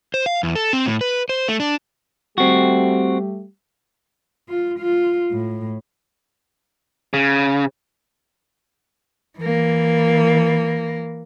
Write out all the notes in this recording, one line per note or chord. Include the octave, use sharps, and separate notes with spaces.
C5
F5
E2
A4
C4
A2
B4
C5
A3
D4
G3 A3 C4 F#4 G4
F4
F4
A2
C#3
E3 A#3